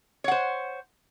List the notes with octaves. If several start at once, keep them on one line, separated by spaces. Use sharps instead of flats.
C5 C#5 F#5